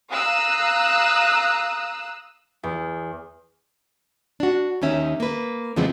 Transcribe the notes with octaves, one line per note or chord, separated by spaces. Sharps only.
F5 A#5 D#6 E6 F#6
E2
D4 F#4
D#2 D#3 C#4 E5
A#3 B4
E2 C#3 F3 G#3 B3 C4